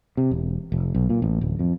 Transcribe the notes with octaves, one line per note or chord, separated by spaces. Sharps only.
C3
E1
F1
B1
A#2
A1
D1
F2